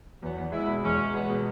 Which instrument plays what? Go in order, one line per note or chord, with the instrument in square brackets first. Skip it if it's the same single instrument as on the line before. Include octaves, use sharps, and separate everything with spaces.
[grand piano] E2 [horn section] F#3 B3
[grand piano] E2
[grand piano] G#3 [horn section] B3 E4
[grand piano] B2
[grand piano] E2 [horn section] G#3 C#4
[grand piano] E2
[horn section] F#3 B3 [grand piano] G#3
[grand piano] B2